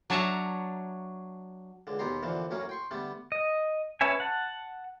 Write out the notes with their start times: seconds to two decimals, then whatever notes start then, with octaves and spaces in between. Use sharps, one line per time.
0.10 F#3 D4 C#5 E5 A5 A#5
1.87 C#2 D3
1.99 D#2 B2 B3 G4 A#5 C6
2.23 A#2 D3 E3 F3
2.51 F#2 A2 F#3 A#3 C#4
2.69 G5 C6 C#6
2.91 D3 G3 A3 B3
3.32 D#5
4.01 C#4 B4 C#5 E5 G#5
4.20 F#5 A5